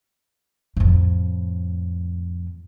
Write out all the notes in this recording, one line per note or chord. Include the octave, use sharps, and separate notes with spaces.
F2 A2